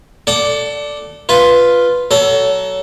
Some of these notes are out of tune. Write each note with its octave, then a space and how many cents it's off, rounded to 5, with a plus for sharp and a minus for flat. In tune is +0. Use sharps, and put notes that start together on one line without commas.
A4 +0 D5 +0 F#5 +35
F4 +0 B4 +0
F#3 +25 A4 +0